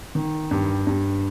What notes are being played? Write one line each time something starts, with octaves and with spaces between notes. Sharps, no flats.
D#3
G2
G2